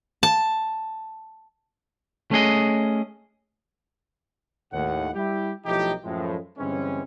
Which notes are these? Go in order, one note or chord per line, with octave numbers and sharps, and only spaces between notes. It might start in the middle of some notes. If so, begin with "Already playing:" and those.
A5
A3 C#4 G#4 D#5
D#2 A2 F#5
G3 E4 G4
B1 F3 A3 D#4 E4 G4
F#2 A2 F3 G#3
G2 D3 E3 G#3 C4 C#4